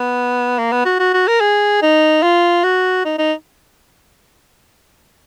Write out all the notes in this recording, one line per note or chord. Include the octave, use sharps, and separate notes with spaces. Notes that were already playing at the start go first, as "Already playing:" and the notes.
Already playing: B3
A#3
B3
F#4
F#4
F#4
A#4
G#4
D#4
F4
F#4
D#4
D#4